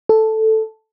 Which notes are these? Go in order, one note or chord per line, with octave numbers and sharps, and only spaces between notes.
A4